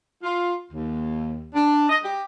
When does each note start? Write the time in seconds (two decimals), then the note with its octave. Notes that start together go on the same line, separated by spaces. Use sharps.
0.23 F4
0.72 D#2
1.55 D4
1.90 D#5
2.04 G4